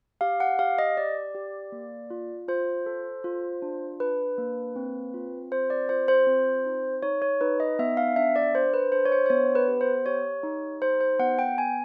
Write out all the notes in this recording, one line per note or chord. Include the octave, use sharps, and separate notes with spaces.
G4 F5
F#5
G4 F5
D#5
G4 D5
G4
A#3
F4
F4 C5
A4
F4
D4
D4 B4
A#3
C4
F4
C4 C5
D5
F4 C5
C5
C4
D#4
D#4 C#5
C#5
D#4 B4
D#5
B3 E5
F5
D4 E5
D5
D4 C5
B4
D4 C5
C#5
C5
C5
B3 C#5
B4
G4
C5
G4 C#5
D#4
G4 C5
C5
B3 F#5
G5
B3 G#5